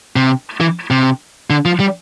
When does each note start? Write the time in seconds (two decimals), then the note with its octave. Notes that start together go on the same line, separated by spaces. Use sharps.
0.16 C3
0.61 E3
0.90 C3
1.50 D3
1.65 F3
1.80 G3